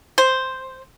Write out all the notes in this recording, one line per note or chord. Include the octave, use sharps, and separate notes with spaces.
C5